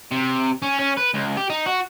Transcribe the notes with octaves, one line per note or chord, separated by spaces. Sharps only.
C3
C#4
C#4
B4
C#2
G4
D#4
F#4